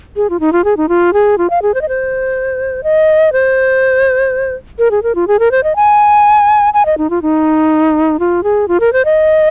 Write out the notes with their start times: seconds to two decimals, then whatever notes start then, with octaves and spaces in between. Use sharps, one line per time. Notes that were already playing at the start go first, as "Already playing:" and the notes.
0.16 G#4
0.30 F4
0.40 D#4
0.53 F4
0.65 G#4
0.77 D#4
0.89 F4
1.13 G#4
1.38 F4
1.50 F5
1.62 G#4
1.74 C5
1.82 D#5
1.89 C5
2.84 D#5
3.33 C5
4.79 A#4
4.91 G#4
5.03 A#4
5.15 F4
5.28 G#4
5.40 A#4
5.51 C5
5.64 D#5
5.76 G#5
6.74 G#5
6.86 D#5
6.98 D#4
7.10 F4
7.22 D#4
8.20 F4
8.44 G#4
8.68 F4
8.80 A#4
8.93 C5
9.05 D#5